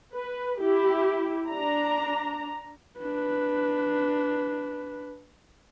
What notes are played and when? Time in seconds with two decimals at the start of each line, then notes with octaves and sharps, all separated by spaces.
0.15 B4
0.61 E4 G4
1.49 D4 A#5
3.00 D4 B4